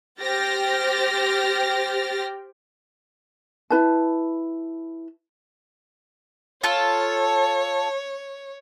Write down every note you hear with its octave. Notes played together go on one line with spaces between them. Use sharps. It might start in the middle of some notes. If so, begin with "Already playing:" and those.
G4 C5 G5 F6 A6 A#6
E4 B4 A5
F4 A4 C#5